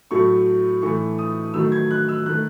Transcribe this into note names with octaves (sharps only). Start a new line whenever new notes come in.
A2 F#3 A3 C#6
A2 E3 A3 C#6
D#6
D#3 F#3 A3 E6
G#6
F#6
E6
D#3 A3 F#6